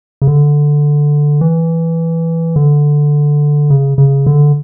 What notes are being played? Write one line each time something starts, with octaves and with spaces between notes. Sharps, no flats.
C#3
D3
E3
D3
C#3
C#3
D3